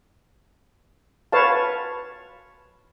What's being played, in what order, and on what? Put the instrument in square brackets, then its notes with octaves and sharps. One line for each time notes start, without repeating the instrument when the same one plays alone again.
[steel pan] B4 C#5 F5 A5